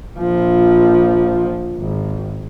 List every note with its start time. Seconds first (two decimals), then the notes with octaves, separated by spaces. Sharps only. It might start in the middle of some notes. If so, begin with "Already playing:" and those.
0.19 A#1 F3
1.78 G#1